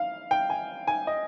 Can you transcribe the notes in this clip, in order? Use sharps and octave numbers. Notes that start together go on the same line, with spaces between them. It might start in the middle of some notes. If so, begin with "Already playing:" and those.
Already playing: F5
G5
G#5
G#5
D#5